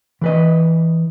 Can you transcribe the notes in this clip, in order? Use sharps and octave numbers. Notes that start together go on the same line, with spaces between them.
E3 B4 D#5